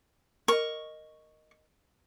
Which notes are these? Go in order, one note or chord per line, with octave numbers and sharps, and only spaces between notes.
A#4 D#5 C#6